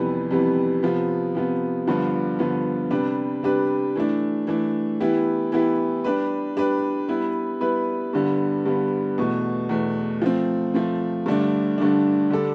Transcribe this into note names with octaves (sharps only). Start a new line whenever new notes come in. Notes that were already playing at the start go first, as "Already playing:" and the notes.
Already playing: F2 C3 E3 G3 B3
F2 C3 E3 G3 B3
C3 F3 B3
C3 F3 B3
G2 D3 F3 B3
G2 D3 F3 B3
C3 G3 D4 G4 B4
C3 G3 D4 G4 B4
E3 A3 D4
E3 A3 D4
E3 B3 E4 G4
E3 B3 E4 G4
G3 D4 G4 B4
G3 D4 G4 B4
G3 B3 E4 B4
G3 B3 E4 B4
G2 D3 G3 B3
G2 D3 G3 B3
E2 B2 A3
E2 B2 A3
F3 A3 C4
F3 A3 C4
G2 D3 A3 D4
G2 D3 A3 D4
D3 G3 D4 A4